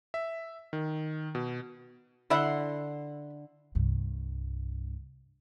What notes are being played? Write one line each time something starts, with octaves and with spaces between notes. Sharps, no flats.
E5
D#3
B2
D3 E4 E5 F#5 C6
C2 G2